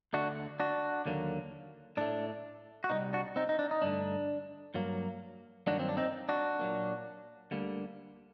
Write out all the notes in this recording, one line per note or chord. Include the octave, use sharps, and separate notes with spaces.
D2 D3 A3 D4 F#4
D4 F#4
D#2 D3 F#3 A#3
A2 A3 D4
F#4
C2 C3 G3 C4 D#4
D4 F#4
C4 D#4
D#4
D4
D#4
G2 D3 A3 D4
G2 F#3 A#3
G2 D#3 F#3 A#3 D4 F#4
C4
D4
C4 D#4
D4 F#4
A#2 F#3 A#3
D2 D3 G3 A#3